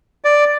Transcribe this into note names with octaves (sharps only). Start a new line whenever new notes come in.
D5